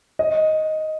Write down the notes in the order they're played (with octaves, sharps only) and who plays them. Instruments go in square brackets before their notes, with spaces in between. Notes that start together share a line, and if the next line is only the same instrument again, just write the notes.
[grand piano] D#5